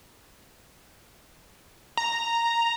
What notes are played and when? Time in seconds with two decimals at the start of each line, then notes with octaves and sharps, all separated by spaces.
1.97 A#5